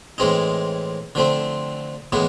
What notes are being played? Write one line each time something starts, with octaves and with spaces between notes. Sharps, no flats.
A2 E3 G#3 C4 D#4
D3 F3 A3 C4
A2 E3 G#3 B3